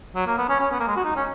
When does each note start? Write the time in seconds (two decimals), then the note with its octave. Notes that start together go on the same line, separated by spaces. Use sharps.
0.15 F#3
0.27 A#3
0.38 B3
0.49 C#4
0.60 C#4
0.72 B3
0.80 A#3
0.88 G#3
0.97 F#4
1.05 D#4
1.16 C#4